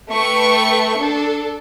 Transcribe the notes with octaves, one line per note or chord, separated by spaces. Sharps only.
A3 B4 G5 C#6
D4 A4